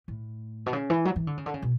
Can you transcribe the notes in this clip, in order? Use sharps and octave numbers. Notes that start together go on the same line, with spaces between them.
A2
B2
C#3
E3
F#3
E3
D3
C#3
D3
C#3
B2